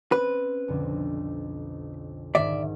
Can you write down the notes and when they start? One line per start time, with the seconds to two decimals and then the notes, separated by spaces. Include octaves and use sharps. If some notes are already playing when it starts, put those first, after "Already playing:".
0.12 C4 C#4 B4
0.68 B1 F2 D3
2.35 G#2 D#3 D5 E5